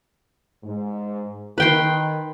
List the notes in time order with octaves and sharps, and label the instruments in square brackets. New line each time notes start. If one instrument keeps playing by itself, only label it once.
[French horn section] G#2
[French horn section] D#3 [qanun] B4 G5 C6